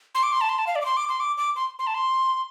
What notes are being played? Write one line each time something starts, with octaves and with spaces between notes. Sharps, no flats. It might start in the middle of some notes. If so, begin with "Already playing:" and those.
C6
D6
C6
A5
C6
A5
F5
D5
D6
C6
D6
C6
D6
D6
C6
C6
A5
C6